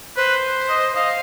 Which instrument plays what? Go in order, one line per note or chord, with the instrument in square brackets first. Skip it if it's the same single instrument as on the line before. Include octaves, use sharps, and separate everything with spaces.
[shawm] B4 [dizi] C5
[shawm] D#5
[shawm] D#5 [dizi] F5